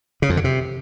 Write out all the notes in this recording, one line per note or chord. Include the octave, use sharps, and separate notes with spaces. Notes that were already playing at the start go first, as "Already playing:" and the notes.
C#3
F2
D3
C3